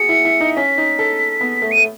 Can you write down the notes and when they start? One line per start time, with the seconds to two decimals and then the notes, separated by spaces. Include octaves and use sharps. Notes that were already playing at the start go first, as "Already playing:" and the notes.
Already playing: F#4 G#4 C#7
0.09 E4
0.25 E4
0.41 D#4
0.56 C#4 B6
0.78 D#4
0.99 A4
1.41 B3
1.62 A3
1.71 D#7
1.77 A3